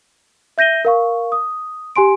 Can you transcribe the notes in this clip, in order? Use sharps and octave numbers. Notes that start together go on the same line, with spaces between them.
E5 G6 A#6 D#7 G7
A#4 F5 C#6
D#6
G4 G#5 C6 D7